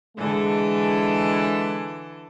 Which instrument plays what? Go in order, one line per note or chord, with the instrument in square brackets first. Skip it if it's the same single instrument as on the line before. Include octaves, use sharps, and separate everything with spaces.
[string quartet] D3 E3 A4 [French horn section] G#3